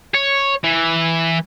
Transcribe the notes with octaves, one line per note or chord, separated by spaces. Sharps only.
C#5
E3